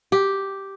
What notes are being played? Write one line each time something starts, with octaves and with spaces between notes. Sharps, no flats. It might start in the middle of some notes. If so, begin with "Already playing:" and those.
G4